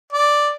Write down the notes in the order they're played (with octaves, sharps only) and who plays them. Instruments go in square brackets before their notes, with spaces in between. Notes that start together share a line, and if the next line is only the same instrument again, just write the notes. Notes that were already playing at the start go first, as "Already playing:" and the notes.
[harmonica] D5